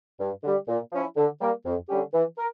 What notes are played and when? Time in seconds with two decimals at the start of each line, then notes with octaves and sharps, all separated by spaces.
0.20 G2
0.44 D3 G3
0.68 A#2
0.92 F3 C#4 E4
1.17 D3
1.41 G3 A#3
1.65 F2
1.89 D3 G3 C#4 G4
2.13 E3
2.38 A#4